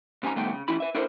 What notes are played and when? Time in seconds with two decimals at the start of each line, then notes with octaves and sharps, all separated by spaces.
0.23 G#2 C#4 G#5 A#5
0.36 G2 D#3 A3 B3 G5
0.52 C#3
0.68 E3 C#4 E4 B5
0.80 B4 E5
0.95 D4 E4 A4 A#4 C5